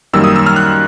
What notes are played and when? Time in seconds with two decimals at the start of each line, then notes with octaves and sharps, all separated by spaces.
0.13 F#2 D#3 G3 A#3 E6
0.24 D#6
0.36 E6
0.46 F6
0.56 F#6